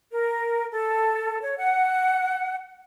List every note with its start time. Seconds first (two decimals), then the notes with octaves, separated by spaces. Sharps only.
0.11 A#4
0.71 A4
1.42 C#5
1.57 F#5